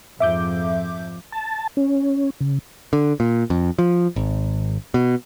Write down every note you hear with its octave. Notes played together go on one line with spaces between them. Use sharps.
F2 G#2 F3 E5 D6 G6
A5
C#4
C#3
D3
A#2
F2
F3
G#1
B2